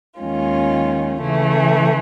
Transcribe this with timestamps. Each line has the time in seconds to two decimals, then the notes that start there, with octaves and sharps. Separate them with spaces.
0.19 D#2 D#3 G#3 C#4 F4
1.20 C#3 E3 A3